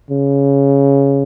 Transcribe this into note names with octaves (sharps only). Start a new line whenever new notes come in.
C#3